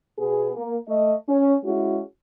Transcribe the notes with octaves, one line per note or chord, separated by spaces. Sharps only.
B2 B3 G#4
A#3
A3 D#5
C#4
G#3 C#4 E4 F#4